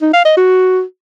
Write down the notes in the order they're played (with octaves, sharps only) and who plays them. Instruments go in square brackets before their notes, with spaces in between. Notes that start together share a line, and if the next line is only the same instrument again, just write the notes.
[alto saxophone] D#4
F5
D#5
F#4